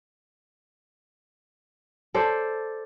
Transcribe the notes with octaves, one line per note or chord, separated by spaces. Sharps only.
A4 C5 D5